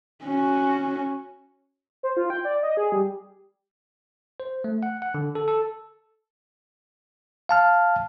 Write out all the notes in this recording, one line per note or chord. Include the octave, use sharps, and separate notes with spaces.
C#4 F#4
C5
F4
G5
D5
D#5
G#4
G3
C5
A3
F#5
F#5
D3
A4
A4
F5 A5 F6